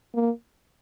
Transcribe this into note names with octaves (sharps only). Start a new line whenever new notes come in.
A#3